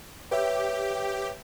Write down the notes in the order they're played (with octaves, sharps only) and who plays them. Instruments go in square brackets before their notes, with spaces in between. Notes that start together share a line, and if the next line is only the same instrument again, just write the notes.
[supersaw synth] G4 [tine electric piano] B4 C#5 E5